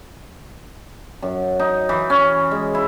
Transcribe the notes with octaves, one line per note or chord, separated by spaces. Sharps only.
F#2
D#4
E3
C#4
G#3
E4